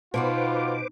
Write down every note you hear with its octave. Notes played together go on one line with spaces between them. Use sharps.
B2 D#4 F4 F#4 B4 C5 D6